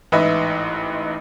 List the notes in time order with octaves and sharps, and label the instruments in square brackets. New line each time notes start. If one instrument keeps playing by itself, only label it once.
[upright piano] A1 G#2 B4 D#5 E5